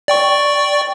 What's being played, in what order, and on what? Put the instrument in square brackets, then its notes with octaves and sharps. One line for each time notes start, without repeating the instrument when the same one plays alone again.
[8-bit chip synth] D5 G5 C#6